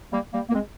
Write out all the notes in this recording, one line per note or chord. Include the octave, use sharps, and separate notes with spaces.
G3 A#3
G3 A#3
A#3
G#3 C4